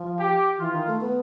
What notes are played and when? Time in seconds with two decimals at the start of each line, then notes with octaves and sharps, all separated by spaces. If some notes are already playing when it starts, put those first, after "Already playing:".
Already playing: F3
0.17 G4
0.59 E3 F4
0.73 D#3
0.87 A3
1.01 B3